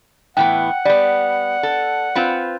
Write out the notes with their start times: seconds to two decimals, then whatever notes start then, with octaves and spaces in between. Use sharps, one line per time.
0.37 A2 E3 B3 F#5 G5
0.85 G3 B3 D5
1.63 A4
2.15 C4 F4 B4